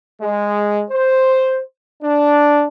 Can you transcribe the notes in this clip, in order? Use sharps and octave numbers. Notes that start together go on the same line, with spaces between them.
G#3
C5
D4